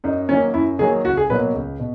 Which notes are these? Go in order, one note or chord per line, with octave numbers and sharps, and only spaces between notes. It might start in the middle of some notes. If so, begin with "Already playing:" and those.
F#2 D#4
D#3 F#3 A#3 C#4
F#2 E4
D#3 F#3 A#3 G#4
C#2 F#4
G#4
B2 F#3 A#3 B4
C#2
B2